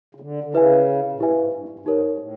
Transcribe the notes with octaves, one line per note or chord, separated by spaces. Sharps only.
C#3
D3
D3
C#3 E4 G4 B4 E5 G#5
A#2
A2 E4 G4 B4 E5 G#5
G#2
G2
G2
G2
G#2 D#4 G4 A#4 C#5
G#2
A2